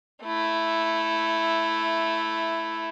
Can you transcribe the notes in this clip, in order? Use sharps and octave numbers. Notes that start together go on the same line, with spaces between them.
A3 E4